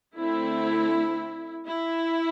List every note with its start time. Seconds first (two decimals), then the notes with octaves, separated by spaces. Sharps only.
0.16 D3 A3 C4 E4
1.66 E4